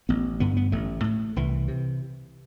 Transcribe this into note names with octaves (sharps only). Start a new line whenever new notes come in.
A1 B3
G2 D3 B3
B3
A1 A3
A2
C2 E3
C3